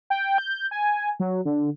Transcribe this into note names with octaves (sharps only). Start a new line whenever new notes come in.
G5
G6
G#5
F#3
D3